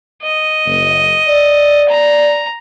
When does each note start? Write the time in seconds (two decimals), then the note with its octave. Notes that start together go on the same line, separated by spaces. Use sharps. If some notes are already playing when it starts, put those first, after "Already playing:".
0.22 D#5
0.66 F#1
1.28 D5
1.89 A#5